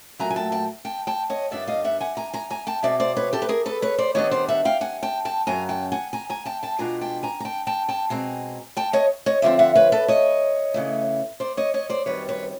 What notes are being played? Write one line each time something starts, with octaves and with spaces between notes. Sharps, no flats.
A#2 F#3 A3 G#5 A#5
G#5
G5 A5
G5 A5
G5 A5
G5 A5
C#5 D#5
G2 D#3 G3 B3 D4 D5 E5
D#5 F5
E5 F#5
F#5 G#5
G#5 A#5
G#5 A#5
G#5 A#5
G5 A5
B2 G#3 C4 D5 E5
C5 D5
B4 C#5
G4 A4
B4
G#4 A#4
A4 B4
B4 C#5
C5 D5
D#3 G3 B3 D4 C#5 D#5
C5 D5
E5 F#5
F5 G5
F#5 G#5
G5 A5
G5 A5
F#2 C#3 F#3 G#5 A#5
G5 A5
F#5 G#5
G#5 A#5
G#5 A#5
G5 A5
G5 A5
B2 G#3 B3 D4 F4 G#5 A#5
G5 A5
G#5 A#5
A#5
G5 A5
G5 A5
G5 A5
B2 G#3 C4 G#5 A#5
G5 A5
C#5 D#5
C#5 D#5
D3 F3 A3 C4 D5 E5
E5 F#5
B4 C#5
A4 B4
C#5 D#5
C#3 E3 A3
C5 D5
C#5 D#5
C#5 D#5
C5 D5
F#2 D#3 G3 C4 B4 C#5
B4 C#5